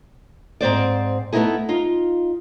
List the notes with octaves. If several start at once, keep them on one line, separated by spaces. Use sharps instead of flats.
G#2 C4 C5 D5
A3 B3 C4 D#4 E4 G#4
D#4 F4